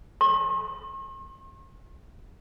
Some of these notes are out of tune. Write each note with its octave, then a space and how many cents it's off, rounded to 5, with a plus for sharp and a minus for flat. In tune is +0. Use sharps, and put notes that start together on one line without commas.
C6 +45